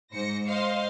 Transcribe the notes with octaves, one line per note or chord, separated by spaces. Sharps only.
G#2 C5 A#6 C#7
C5 D#5 F5 C6